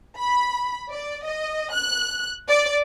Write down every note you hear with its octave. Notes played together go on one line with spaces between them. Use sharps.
B5
D5
D#5
F#6
D5